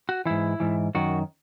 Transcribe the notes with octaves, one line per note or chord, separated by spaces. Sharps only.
F#4
G#2 E3 E4
G#2 E3
F#2 D#3 F#4